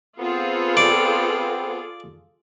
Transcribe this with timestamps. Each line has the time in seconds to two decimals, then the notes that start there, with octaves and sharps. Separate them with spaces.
0.19 B3 C4 F4 G#4 A4
0.77 D5